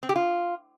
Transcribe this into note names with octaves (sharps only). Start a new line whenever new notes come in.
C4
G4
F4